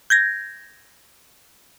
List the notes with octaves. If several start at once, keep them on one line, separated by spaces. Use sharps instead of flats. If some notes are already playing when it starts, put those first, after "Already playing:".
G6 G#6 A#6